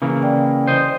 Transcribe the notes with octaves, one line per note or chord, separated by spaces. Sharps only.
C#3 E3 A#3
D5 G5
C5 D#5